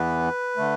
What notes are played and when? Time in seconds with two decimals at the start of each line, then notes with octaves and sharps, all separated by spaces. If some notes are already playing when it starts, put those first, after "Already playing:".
Already playing: E2 E3 B3 B4
0.57 D3 A3